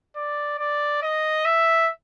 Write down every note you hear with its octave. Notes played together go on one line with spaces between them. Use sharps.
D5
D5
D#5
E5